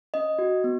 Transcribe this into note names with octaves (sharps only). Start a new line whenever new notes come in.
C#4 D#5
F#4
B3